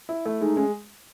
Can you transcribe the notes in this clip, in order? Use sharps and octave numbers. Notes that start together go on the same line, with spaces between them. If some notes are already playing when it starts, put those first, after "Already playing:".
E4
A3
G#3 D#4
G#3 C#4